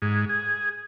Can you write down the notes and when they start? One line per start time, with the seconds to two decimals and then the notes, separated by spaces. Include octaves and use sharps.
0.02 G#2
0.29 G#4